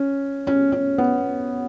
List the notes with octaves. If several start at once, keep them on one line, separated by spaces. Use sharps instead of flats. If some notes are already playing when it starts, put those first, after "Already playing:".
Already playing: C#4
C#4
C#4
B3